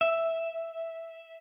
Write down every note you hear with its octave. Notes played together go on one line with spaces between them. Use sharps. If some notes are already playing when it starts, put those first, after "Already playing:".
E5